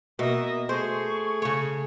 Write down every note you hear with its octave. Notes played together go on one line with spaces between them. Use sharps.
B2 A#3 D#5 E5
A3 G#4 C5 C#6
C#3 C#5